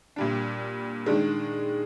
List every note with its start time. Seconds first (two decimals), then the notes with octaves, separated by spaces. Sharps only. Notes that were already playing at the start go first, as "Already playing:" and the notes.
0.16 A#2 G3 D4
1.06 D#3 G#3 D4